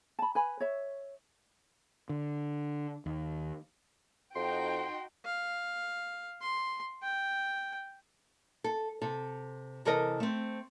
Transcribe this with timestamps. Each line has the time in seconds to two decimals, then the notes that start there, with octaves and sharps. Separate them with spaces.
0.19 A5 B5
0.35 B4 G#5 B5
0.60 C#5 E5
2.09 D3
3.06 D#2
4.36 F2 D#4 F#4 G5 C6
5.26 F5
6.41 C6
7.03 G5
8.64 A4
9.02 C3 A4
9.85 C3 E3 A4 A#4 D#5
10.20 A3 C4